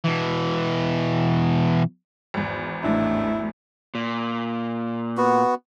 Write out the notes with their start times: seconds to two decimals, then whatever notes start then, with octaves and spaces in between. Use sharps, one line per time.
0.05 B2 E3
2.34 G#1 E2
2.84 A1 A3 D4 E4
3.95 A#2
5.17 B3 F#4